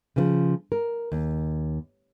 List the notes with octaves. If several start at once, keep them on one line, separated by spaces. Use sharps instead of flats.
C#3 E3 F3
A#4
D#2